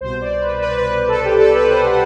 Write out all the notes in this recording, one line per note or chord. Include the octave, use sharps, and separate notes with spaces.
C2 B2 C5
D5
B4
B4
B4
A4
G4
A4
B4
C5
F#5